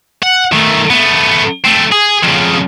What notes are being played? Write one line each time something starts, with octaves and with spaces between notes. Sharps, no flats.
F#5
D#3 A3
A3 B3
A3 C4
G#4
F2 C#3